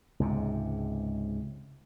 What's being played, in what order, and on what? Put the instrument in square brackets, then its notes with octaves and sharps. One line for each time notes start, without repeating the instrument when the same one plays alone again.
[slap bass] C#2 G#2 C3